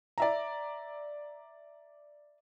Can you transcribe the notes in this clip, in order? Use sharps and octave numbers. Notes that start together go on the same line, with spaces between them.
D5 E5 A#5